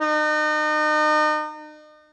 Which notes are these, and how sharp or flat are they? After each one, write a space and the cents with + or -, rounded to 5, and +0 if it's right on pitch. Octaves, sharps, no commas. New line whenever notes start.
D#4 -35